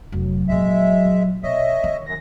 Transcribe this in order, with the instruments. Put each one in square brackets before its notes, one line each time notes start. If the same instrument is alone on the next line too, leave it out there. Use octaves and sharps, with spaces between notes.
[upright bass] F1 D4 [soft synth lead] F#3
[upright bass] F2 A#2 [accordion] G#3 E5
[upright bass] A#1
[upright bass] B2 [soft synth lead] C#5 [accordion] D#5 E5
[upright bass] D#3
[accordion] F#2 [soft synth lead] A#6